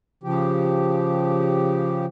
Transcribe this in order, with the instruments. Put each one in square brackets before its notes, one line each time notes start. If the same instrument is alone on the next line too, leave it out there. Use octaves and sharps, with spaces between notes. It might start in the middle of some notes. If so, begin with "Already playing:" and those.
[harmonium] C#3 F3 G4